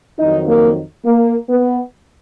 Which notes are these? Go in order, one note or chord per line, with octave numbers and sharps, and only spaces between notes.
F2 D#3 F#3 D#4
A#3
A#3
B3